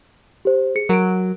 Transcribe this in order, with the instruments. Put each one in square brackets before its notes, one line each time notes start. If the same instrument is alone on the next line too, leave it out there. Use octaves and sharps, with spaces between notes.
[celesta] G4 C5
G#4 C#7
[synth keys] F#3 [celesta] A#4 D7